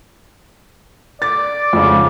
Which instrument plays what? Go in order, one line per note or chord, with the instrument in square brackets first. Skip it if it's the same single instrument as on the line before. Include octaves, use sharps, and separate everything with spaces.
[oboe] D5 [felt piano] A6
[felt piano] F2 G#2 C#3